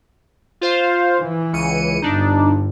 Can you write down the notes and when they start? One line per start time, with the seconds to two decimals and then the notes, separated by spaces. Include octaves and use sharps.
0.61 F4 C5 F5
1.19 E3
1.53 C#2 C#7 D#7
2.02 G1 G2 D4 D#4